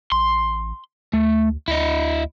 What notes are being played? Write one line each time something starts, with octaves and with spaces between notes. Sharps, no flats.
A1 C6
D2 A3
D2 E4 D#5